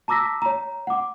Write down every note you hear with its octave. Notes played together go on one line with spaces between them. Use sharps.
A5 A#5 D6 E6 A#6 B6
C#5 A#5
F#5 D6